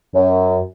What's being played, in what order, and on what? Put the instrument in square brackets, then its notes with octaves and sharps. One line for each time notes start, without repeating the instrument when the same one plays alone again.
[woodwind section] F#2